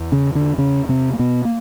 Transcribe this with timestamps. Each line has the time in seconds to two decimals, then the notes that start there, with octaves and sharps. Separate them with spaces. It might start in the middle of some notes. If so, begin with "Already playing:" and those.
Already playing: E2
0.12 C#3 C#4
0.35 D3 D4
0.58 C#3 C#4
0.89 C3 C4
1.13 A#3
1.19 B2 B3
1.45 A#3